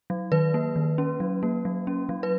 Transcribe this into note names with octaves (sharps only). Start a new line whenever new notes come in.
F#3
D#3 B4
A#3
D#3
C#4
F#3
A#3
F#3
C#4
F#3
B4